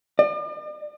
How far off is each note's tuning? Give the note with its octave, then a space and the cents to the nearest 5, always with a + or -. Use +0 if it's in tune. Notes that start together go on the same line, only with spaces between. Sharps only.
D5 +45